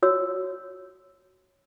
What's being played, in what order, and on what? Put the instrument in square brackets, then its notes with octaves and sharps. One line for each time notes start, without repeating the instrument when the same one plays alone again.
[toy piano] F#4 C#5 E6